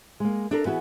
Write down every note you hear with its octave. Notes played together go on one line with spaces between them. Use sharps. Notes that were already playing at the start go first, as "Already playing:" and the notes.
G#3 A#3
D4 A4 A#4
E3 B3 F#4 G#4